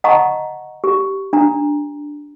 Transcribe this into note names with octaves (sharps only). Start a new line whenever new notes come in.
D#5 F#5 A5 A#5 C#6
G4
D4 A#5